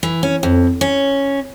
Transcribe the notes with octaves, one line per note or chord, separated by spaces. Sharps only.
E3
C#4
F2
C#4